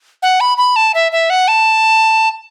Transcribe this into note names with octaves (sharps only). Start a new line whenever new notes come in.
F#5
B5
B5
A5
E5
E5
F#5
A5